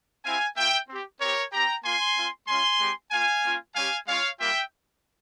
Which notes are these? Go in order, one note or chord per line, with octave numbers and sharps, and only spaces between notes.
C4 E4 G4 F5 G#5
A#3 F4 E5 G5
C4 G4
C4 G4 A#4 C#5
C4 G4 G5 A#5
A#3 F4 G#5 C6
C4 F4
G#3 C#4 F4 G#5 C6
G#3 C4 G4
A#3 F4 F5 G#5
A#3 C#4 F4
G3 C#4 G4 F5 G#5
G#3 C#4 F4 C#5 F5
G3 A#3 F4 E5 G5